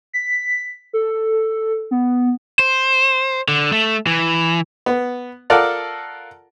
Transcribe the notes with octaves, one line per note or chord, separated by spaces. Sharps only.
B6
A4
B3
C5
D3
A3
E3
B3
F4 A4 A#4 D5 F5 F#5